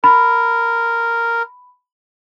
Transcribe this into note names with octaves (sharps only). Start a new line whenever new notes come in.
A#4 B5